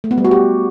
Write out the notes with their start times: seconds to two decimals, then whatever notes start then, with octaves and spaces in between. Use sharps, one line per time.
0.04 A3
0.11 B3
0.18 G3
0.25 F#4
0.31 G4